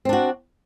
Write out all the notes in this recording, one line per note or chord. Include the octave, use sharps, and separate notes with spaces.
C4 D4 F#4